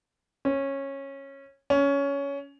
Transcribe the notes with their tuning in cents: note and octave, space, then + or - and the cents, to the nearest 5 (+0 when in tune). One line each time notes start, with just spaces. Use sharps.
C#4 -15
C#4 +15